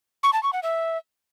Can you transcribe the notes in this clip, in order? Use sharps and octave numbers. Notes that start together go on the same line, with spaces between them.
C#6
A5
C#6
F#5
E5